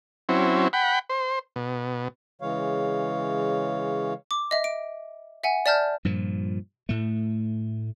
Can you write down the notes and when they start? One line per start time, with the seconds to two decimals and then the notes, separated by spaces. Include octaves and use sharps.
0.29 F#3 C4 C#4 E4
0.73 F#5 G5 B5
1.09 C5
1.56 B2
2.41 C#3 E3 G#3 C#5 F5
4.31 D6
4.51 D#5 E5
4.64 D7
5.43 E5 F#5 G#5
5.66 D5 E5 A5 F6 G6
6.05 G2 A#2 F3
6.89 A2 A3